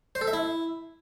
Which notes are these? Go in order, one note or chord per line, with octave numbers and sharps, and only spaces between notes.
C5
A4
E5
E4